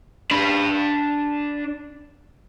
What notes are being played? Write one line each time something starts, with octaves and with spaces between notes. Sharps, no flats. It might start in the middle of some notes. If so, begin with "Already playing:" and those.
D4 B5